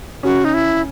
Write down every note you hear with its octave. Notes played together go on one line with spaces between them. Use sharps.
C#3 C#4 F#4
D#4
E4